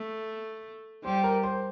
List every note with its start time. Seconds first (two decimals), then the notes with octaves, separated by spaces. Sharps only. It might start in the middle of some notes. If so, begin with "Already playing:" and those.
Already playing: A3 A4
1.04 G3 C5
1.24 A#4
1.43 C5